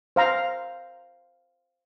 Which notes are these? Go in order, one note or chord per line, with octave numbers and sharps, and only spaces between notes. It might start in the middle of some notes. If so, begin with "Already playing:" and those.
C5 F5 A#5